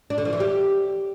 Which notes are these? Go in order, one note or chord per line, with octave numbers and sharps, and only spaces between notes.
D4
D3
F3
E3
G4